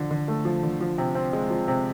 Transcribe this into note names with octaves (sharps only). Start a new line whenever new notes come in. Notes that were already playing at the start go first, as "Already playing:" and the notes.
Already playing: D3 F3
D3
A3
F3
D3
F3
C3
C4
G#3
F3
C3